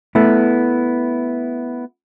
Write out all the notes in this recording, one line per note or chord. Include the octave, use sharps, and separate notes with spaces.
A3 B3 E4